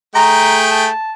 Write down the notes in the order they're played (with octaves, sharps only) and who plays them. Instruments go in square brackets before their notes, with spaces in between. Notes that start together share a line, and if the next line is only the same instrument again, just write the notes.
[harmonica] A3 G#4 G5 [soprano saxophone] A#5
[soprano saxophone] A5